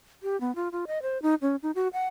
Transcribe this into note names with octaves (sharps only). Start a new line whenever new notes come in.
G4
B3
F4
F4
D#5
C5
D#4
C#4
D#4
F#4
F#5